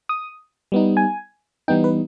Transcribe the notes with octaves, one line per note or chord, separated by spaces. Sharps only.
D#6
G3 B3 D#4
G#5
E3 G3 B3 D#4 G5
B4